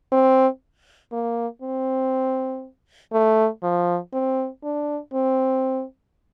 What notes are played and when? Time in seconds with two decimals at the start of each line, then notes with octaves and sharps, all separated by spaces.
0.12 C4
1.12 A#3
1.62 C4
3.13 A3
3.63 F3
4.13 C4
4.63 D4
5.13 C4